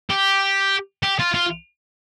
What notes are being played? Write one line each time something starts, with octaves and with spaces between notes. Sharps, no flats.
G4
G4
F4
F4